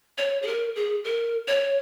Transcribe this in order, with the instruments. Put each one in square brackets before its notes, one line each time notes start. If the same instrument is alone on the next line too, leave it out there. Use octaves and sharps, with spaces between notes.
[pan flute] C#5
G#4
A#4
G#4
A#4
C#5